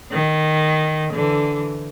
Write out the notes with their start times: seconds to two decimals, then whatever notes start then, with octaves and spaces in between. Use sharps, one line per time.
0.11 D#3
1.13 D3 E3